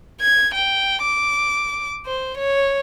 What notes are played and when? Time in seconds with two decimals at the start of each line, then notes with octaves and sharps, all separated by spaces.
0.21 G#6
0.54 G5
1.02 D6
2.06 C5
2.38 C#5